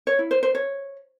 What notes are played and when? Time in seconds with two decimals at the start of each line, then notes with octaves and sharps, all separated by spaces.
0.07 C#5
0.19 E4
0.31 C5
0.43 C5
0.55 C#5